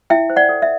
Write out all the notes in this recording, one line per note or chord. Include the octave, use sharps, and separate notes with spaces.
E4 E5 G5
C5
D5 F#5
A4
E5